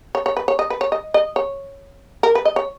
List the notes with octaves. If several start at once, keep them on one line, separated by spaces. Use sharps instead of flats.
C#5
C#5
B4
C#5
D#5
B4
C#5
D#5
D#5
C#5
A#4
B4
D#5
C#5